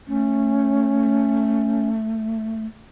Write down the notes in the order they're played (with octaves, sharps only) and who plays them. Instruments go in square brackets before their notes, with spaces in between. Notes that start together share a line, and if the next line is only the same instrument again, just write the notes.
[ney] A3 [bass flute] C#4